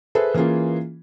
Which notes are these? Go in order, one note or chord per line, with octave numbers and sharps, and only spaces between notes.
G#4 A4 B4 C5 E5
E3 A#3 C#4 F4 G#4